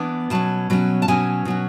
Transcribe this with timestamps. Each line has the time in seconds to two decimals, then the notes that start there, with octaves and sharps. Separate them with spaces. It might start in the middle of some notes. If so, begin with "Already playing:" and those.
Already playing: E3 B3 D4
0.30 B2 F#3 C#4 A5
0.70 B2 F#3 C#4
1.02 A5
1.08 B2 F#3 C#4 G#5
1.45 B2 F#3 C#4